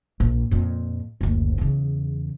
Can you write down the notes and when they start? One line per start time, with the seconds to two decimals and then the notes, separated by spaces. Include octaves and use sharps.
0.20 A#1
0.51 F2 A#2
1.21 F#1 D2
1.58 E2 C#3